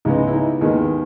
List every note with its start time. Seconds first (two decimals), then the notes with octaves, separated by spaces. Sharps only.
0.05 C#2 C#3 G#3 B3 D#4
0.27 E4
0.33 D#4
0.61 D#2 D#3 G#3 B3